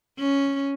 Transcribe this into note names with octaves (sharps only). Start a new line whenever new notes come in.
C#4